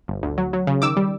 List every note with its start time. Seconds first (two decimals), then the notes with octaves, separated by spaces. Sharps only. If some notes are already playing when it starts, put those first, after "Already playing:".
0.08 G1
0.23 D2
0.38 F#3
0.53 F#3
0.67 C#3
0.82 D#3 D6 E6
0.97 G3